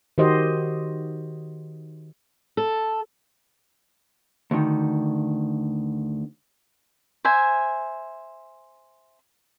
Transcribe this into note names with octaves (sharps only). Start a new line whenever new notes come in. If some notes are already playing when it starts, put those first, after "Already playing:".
D#3 F#4 G4 C5 D#5
A4
D2 D#3
C5 E5 G#5